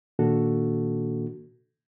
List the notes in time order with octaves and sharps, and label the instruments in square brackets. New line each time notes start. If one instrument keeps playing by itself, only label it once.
[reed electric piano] A#2 D#3 A#3 D4 F#4 A4